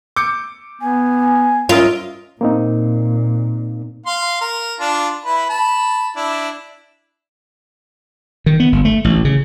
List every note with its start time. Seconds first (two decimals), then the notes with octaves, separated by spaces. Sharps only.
0.16 D6 G6 C#7
0.81 B3 G#5
1.69 C#4 E4 F4 A#4 D#5
2.41 A#2 A#3 C4 D#4
4.06 F5 C6
4.41 A#4
4.80 D4 F4 A5
5.25 E4 B4
5.50 A5 B5
6.16 D4 E4
8.46 D#3
8.60 B3
8.72 G1
8.85 A3
9.04 A1
9.25 C#3